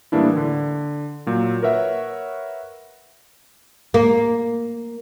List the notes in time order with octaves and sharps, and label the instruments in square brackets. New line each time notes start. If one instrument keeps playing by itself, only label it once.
[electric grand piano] A2 E3 G3 A#3 D4 E4
D3
A#2 F#3
A#4 B4 C#5 E5 F#5
[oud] A#3